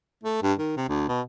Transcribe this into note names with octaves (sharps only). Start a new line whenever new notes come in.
A3
G2
D#3
C3
D2
B2